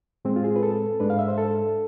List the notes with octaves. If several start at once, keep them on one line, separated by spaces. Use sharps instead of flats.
A2 G#3 C4
F4
G#4
B4
A4
G#2 G#3 D4 B4
F5
E5
C5
A4